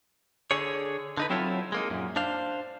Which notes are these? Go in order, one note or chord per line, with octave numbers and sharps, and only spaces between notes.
D3 G#4 C#5
D3 D#4 B4
F#3 C4 E4 F4 A4 C#5
G#3 A#3 D#4
F#2 A#2
D4 C5 F5